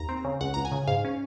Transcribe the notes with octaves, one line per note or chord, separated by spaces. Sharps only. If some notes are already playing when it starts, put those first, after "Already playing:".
Already playing: D#2 A#5
C4
C#3
C#2 F#5
C#2 A#5
G#5
C#3
G#2 F5
C#4